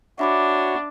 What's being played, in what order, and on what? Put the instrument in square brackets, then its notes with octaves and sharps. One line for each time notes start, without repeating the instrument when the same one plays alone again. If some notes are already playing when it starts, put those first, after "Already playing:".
[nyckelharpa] D4 [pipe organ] F#4 C#5 [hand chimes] E5 B5 D6